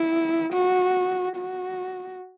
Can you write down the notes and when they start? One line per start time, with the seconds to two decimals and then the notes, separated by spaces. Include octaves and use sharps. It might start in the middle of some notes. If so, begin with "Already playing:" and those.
Already playing: E4
0.53 F#4
1.36 F#4